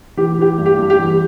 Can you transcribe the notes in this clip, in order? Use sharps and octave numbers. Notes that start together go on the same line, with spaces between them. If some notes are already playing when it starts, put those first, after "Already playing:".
E3 G4
E3 G4
G2
G4
G2
G4
E3